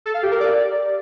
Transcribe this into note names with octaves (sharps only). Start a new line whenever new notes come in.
A4
F5
G4
A#4
D5